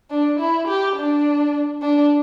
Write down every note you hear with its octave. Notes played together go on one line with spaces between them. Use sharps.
D4
E4
G4
D4
D4